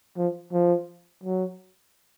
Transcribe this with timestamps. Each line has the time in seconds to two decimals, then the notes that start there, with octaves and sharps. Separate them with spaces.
0.17 F3
0.53 F3
1.23 F#3